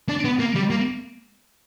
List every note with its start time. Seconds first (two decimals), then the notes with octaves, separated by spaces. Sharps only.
0.09 D4
0.24 B3
0.39 A#3
0.55 G3
0.70 A#3